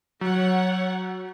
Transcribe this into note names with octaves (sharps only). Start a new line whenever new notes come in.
F#3 C#5 F#5